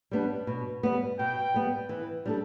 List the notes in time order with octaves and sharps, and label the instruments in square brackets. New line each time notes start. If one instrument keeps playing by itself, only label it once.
[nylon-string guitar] G3 B3 D4
B2
G3 B3
[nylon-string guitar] B2 [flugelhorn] G5
[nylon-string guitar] G3 B3
E3
G3 D4 A4